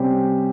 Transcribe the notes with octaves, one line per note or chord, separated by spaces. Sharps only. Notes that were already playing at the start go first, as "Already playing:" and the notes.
Already playing: C3 G3 C#4 G4 C5